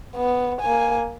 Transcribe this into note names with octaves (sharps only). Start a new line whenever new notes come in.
B3
A#3 G#5